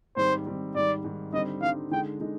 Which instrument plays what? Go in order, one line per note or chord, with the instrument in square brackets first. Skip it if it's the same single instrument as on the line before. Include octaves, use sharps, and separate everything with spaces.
[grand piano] G#2 D#3 G3 C4 [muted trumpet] C5
[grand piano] G#2 D#3 G3 C4
[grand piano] G#2 D#3 G3 [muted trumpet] D5
[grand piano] G#2 D#3 G3
[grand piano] D3 G3 C4 D#4 [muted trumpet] D#5
[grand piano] D3 G3 C4 D#4 [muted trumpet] F5
[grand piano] D3 G#3 D#4 [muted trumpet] G5
[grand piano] D3 G#3 D#4